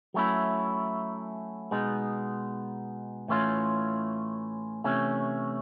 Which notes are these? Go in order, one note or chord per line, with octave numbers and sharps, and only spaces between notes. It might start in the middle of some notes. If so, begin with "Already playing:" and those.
F#3 A3 C#4 E4
B2 G#3 B3 D#4
A2 E3 A3 C#4 F4
C3 E3 A3 C#4